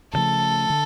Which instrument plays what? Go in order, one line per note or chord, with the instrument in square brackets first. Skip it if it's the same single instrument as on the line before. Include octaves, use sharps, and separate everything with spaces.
[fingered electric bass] D2 C#3 F3 A3 [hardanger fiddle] A4
[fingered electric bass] D3